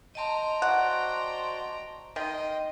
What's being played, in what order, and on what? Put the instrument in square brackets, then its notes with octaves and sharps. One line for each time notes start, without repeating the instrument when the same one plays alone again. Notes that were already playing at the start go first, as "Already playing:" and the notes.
[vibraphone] D#5 A5 C6 [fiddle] G5 A#5
[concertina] F#4 C5 D5 [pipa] F#5
[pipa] D#3 [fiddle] D#5 [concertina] G5 C6